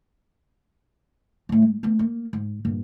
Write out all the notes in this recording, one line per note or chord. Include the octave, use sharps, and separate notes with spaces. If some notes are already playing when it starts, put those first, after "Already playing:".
A2 F3
G#3
A3 B3
A#3
G#2
G2 A#2